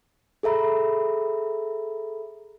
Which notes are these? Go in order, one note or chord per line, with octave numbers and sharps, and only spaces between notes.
G#4 A4 E5 A#5 B5